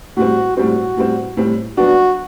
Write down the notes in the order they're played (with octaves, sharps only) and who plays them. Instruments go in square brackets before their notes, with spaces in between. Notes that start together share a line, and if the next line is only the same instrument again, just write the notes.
[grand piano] A2 G3 C4 [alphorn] F#4
[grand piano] A2 G3 C4 [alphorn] F#4
[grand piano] A2 G3 C4
A2 G3 C4
[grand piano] F#3 B3 D4 [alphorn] F#4